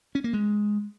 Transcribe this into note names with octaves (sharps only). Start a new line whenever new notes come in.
C#4
A#3
G#3